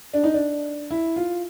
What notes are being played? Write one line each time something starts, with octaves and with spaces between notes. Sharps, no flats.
D4
D#4
D4
E4
F4